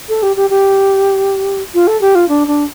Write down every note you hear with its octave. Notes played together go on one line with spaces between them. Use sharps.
A4
G4
G4
G4
F4
A4
G4
F4
D4
D4